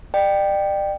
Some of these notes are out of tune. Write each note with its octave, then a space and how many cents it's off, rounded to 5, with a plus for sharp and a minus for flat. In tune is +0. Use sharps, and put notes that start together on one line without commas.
D5 +35 G5 +0